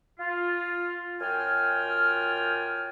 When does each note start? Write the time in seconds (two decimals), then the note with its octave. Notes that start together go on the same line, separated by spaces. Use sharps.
0.19 F4
1.20 F#2 F4 G5 G#5 F6